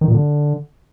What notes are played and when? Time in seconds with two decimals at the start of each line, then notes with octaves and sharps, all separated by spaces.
0.01 D#3
0.08 A#2
0.14 D3